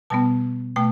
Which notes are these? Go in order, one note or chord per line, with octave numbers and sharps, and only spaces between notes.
B2 G3 B3 A5
B2 A3 G5